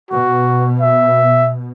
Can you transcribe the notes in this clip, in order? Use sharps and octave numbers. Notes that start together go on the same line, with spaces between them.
B2 F#4
E5